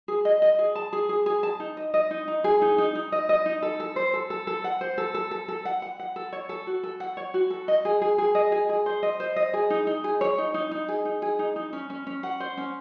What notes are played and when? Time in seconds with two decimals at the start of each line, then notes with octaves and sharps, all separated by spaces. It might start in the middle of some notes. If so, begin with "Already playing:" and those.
0.08 G#4
0.25 D#5
0.42 D#5
0.59 G#4
0.75 A5
0.93 G#4
1.09 G#4
1.26 G#4
1.43 A5
1.60 D#4
1.77 D#5
1.94 D#5
2.11 D#4
2.28 D#4
2.44 G#4
2.62 D#4
2.78 D#4
2.95 D#4
3.12 D#5
3.29 D#5
3.46 D#4
3.62 A4
3.80 A4
3.96 C5
4.13 A4
4.30 A4
4.47 A4
4.64 F#5
4.81 C5
4.98 A4
5.14 A4
5.31 A4
5.48 A4
5.65 F#5
5.82 F#5
6.00 F#5
6.16 A4
6.33 C#5
6.49 A4
6.67 F#4
6.83 A4
7.00 F#5
7.17 C#5
7.34 F#4
7.50 A4
7.68 D#5
7.85 G#4
8.02 G#4
8.18 G#4
8.35 D#5
8.52 G#4
8.69 G#4
8.86 C5
9.03 D#5
9.20 C5
9.36 D#5
9.54 G#4
9.70 D#4
9.87 D#4
10.04 G#4
10.21 C#5
10.38 D#4
10.54 D#4
10.71 D#4
10.88 G#4
11.05 D#4
11.22 G#4
11.39 D#4
11.56 D#4
11.73 C#4
11.90 C#4
12.07 C#4
12.23 F#5
12.40 C5
12.57 C#4